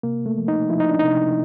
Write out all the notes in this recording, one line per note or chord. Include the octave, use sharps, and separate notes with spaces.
C3 A#3
A3
F3
D#4
F3 E4
D#4
D4
C3 D#4